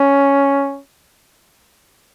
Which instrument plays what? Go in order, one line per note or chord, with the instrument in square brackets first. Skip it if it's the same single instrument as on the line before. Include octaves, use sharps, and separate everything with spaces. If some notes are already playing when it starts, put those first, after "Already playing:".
Already playing: [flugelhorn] C#4